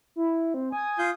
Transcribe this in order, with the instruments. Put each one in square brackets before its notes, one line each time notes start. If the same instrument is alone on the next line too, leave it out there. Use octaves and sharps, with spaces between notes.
[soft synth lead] E4
C4
[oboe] G#5 [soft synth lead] D#6
[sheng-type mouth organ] F4 G6